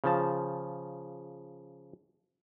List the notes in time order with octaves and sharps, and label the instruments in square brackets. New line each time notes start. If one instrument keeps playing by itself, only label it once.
[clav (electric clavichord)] C#3 F3 A5